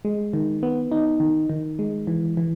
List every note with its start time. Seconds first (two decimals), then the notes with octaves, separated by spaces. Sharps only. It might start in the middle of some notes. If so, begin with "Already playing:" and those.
0.05 G#3
0.33 D#3
0.63 B3
0.92 D#4
1.20 D#3
1.50 D#3
1.79 G#3
2.07 E3
2.37 E3